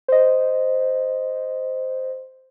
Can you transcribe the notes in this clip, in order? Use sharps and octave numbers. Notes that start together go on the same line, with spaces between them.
C5 D#5